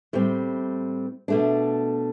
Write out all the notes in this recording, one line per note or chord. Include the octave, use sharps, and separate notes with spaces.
A2 G3 C4
B2 A3 D4